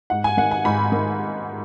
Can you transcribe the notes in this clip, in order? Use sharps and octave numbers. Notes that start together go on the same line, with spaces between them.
G#2 F#5
G#5
D#3 F#5
G#5
G#2 B5
D#3